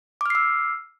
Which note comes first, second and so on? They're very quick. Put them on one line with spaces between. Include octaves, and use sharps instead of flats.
D6 F6 C7 E6